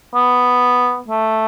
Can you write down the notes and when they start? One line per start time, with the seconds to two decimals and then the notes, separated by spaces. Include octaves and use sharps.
0.15 B3
1.08 A3